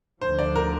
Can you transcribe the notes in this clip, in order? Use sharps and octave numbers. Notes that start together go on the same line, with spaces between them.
D2 D3 F3 C5
D5
A#4